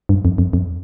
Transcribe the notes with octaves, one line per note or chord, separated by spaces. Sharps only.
G2
F2
F2
F2